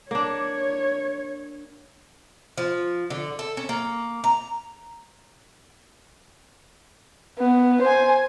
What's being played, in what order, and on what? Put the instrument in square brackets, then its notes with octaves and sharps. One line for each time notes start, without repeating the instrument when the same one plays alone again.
[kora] A#3 D4 [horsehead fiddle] C#5
[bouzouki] F3
D3
A4
C#4
A#3
A#5
[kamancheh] B3
C5 G#5